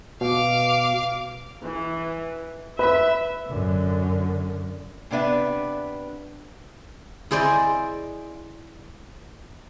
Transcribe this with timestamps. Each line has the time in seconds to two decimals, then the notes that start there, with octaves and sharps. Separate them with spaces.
0.21 B2 F5 D6
1.63 E3
2.79 B4 E5 B5
3.48 F#2 D3
5.11 C3 B3 D4 B4 E5
7.31 E4 G#4 C5 D5 D#5